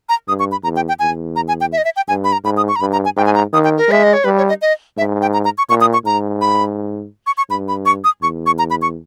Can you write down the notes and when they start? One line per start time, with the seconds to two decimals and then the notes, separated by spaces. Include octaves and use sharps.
0.09 A#5
0.28 G2 D#6
0.39 C#6
0.52 B5
0.64 E2 A#5
0.76 G5
0.88 G5
0.99 E2 G#5
1.36 A#5
1.48 G#5
1.61 G5
1.72 E5
1.78 D#5
1.85 E5
1.96 G5
2.08 G2 G#5
2.24 B5
2.32 A#5
2.44 G#2 B5
2.57 D#6
2.68 C#6
2.76 A#5
2.81 G2 B5
2.93 A#5
3.05 G#5
3.17 G#2 G5
3.26 G#5
3.35 A#5
3.53 D#3 D#6
3.64 G5
3.77 A#4
3.88 G#3 E5
4.03 D#5
4.13 C#5
4.24 G3 B4
4.38 C#5
4.49 D#5
4.62 D#5
4.97 G#2 E5
5.22 G5
5.33 A#5
5.45 A#5
5.58 C#6
5.69 A#2 C#6
5.81 D#6
5.93 C#6
6.05 G#2 A#5
6.41 B5
7.27 C#6
7.37 C#6
7.50 G2 B5
7.68 B5
7.86 C#6
8.04 D#6
8.22 E2 C#6
8.46 C#6
8.59 A#5
8.70 B5
8.82 C#6